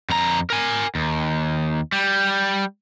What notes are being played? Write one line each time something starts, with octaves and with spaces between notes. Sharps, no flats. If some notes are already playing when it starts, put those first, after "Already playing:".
F2 A#5
A#4 G#5
D#2
G3